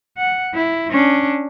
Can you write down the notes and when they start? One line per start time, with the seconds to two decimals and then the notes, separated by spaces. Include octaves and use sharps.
0.17 F#5
0.54 E4
0.90 C#4 D4